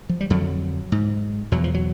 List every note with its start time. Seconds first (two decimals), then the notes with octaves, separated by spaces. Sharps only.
0.09 F3
0.21 G3
0.30 F2 D3 F#3
0.92 G#2
1.52 E2 B2 F#3
1.64 F3
1.74 F#3